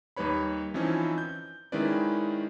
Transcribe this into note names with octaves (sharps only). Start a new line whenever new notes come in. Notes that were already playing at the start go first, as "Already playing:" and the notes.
D#2 G3 D#4 B4 C#5 B5
E3 F3 C4 C#4 D#4 E4
G6
D#3 G#3 C#4 E4 B4 D5